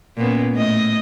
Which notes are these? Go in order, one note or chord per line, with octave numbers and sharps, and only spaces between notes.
A#2 B3 C#4
A2 D#5